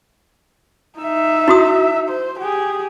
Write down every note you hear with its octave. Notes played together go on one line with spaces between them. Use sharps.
D#4 E5
E4 F#4 D#6
C5
G4 G#4